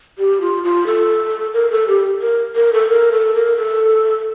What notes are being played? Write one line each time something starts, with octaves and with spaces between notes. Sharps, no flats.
G4
F4
F4
A4
A#4
A4
G4
A#4
A#4
A4
A#4
A4
A#4
A4